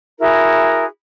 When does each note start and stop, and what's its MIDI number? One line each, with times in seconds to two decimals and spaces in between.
0.19 0.84 64
0.19 0.84 66
0.19 0.84 68
0.19 0.84 70